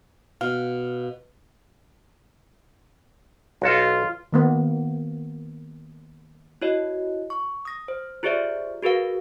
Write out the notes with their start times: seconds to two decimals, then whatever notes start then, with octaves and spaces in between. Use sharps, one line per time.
0.41 B2 F5
3.62 B1 F4 F#4 A4
4.32 D#3 A#3 B3
6.62 E4 F#4 C#5 D#5
7.30 C#6
7.65 D#6 A#6
7.88 C5
8.23 F4 G4 G#4 C5 D5 E5
8.82 F#4 G#4 A#4 B4 F5